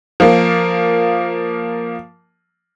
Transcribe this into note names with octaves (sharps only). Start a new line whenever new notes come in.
F3 A#3